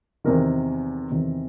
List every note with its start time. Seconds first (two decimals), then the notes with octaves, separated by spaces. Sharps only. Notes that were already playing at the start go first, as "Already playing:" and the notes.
0.24 E2 C3 D#3 A#4
1.10 E2 C3 D#3